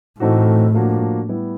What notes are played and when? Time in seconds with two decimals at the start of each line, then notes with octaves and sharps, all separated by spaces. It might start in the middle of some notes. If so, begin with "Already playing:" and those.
0.20 A2 E3 A3 C4 D#4 F#4
0.74 F3 A#3 D4 F#4
1.28 G3 B3 E4